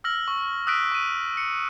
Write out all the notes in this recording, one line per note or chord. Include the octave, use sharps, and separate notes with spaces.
E6 F6 A#6 F#7
C#6
D#6 E6 F#6 A#6 B6 D7
C#6 D#7
C#7